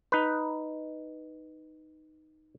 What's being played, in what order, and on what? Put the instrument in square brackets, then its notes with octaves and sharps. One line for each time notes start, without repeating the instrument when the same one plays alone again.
[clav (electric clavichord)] D#4 B4